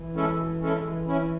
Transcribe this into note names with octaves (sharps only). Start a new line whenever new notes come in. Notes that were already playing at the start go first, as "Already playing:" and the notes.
Already playing: E3
G#3 C#4 E4 A4
B2
G#3 C#4 E4 A4
E3 G#3
C#4 E4